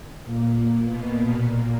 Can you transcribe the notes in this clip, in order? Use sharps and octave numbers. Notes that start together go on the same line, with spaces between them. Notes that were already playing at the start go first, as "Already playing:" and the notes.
A#2 A#3
B2 B3
A#2 A#3
A#2 A#3